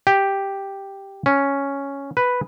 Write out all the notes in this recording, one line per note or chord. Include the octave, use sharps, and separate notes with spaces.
G4
C#4
B4